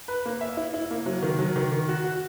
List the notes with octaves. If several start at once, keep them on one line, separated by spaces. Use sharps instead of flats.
B4
A#3
E5
E4
E4
A#3
F#3
D#3
F#3
D#3
D#3
F#4
F#4